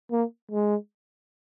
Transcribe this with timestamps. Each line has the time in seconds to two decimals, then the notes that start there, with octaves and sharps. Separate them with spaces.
0.12 A#3
0.51 G#3